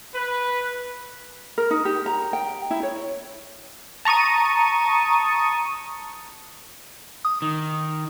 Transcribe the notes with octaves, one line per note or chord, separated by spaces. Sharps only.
B4
A#4
D#4
G4
A#5
G5
E4
C#5
A5 A#5 C#6 D#6 D#7
D#6
D#3